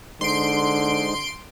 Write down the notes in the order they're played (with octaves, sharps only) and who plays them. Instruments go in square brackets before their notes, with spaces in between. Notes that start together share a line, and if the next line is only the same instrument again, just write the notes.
[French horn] D3 [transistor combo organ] G#3 D#4 C5 [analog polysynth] C6 D7